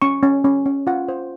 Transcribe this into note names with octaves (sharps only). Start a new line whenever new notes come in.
C#4 C#6
C#4
C#4
C#4
F4 F#5
C5